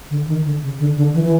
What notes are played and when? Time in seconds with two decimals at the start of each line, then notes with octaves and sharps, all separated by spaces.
0.10 D3
0.27 D#3
0.45 D3
0.63 C#3
0.79 D3
0.97 D3
1.14 E3
1.24 E3